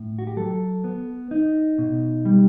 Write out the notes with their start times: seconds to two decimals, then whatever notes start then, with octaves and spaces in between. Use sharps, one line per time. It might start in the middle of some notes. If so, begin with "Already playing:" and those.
Already playing: A2
0.19 F#4
0.27 G4
0.36 F#3 A4
0.84 B3
1.31 D#4
1.78 B2
2.25 G3